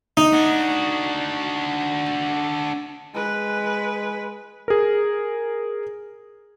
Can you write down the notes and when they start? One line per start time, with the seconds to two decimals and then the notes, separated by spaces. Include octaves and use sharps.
0.17 D#4
0.33 D4 F#4
3.14 G#3 B4
4.68 G#4 A#4